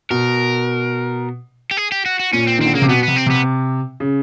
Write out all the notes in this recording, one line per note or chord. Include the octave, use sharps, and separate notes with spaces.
B2 A#4
G4
G#4
G4
F#4
F#4
A#2 C#4
C4
D#3
D3 C4
C#3 A#3
C3
B2 B3
B3
C3
C4
C3 B3
C#3